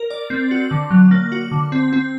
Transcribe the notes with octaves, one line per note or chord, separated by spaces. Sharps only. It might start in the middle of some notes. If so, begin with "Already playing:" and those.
Already playing: A#4
D5
C4
F#4
D3
F#3
A#3
F#4
D3
C4
C4